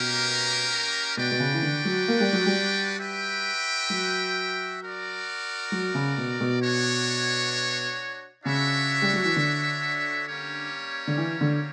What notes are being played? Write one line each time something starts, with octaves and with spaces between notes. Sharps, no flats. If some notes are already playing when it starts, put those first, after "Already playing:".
Already playing: B2 A#3 C#4 G4 A#4
B2 D4 F#4 B4 D5 G5
B2
C#3
E3
D3
F#3
A#3
G3
F#3
G3
F#4 B4 E5 G5
F#3
F#4 A#4 D5
F#3
C#3
B2
B2
D4 F#4 C#5
C#3 D4 F#4 C#5 E5
G3
F#3
E3
D3
G3 A#3 C#4 G4 C#5
D3
E3
D3